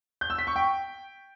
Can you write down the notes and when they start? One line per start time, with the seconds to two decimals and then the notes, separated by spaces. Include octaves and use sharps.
0.21 G6
0.30 E6
0.38 B6
0.47 C#6
0.56 G5